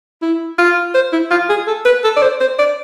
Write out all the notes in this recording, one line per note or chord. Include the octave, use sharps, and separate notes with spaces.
E4
F4
C5
E4
F4
G#4
A4
B4
A4
D5
C5
C5
D5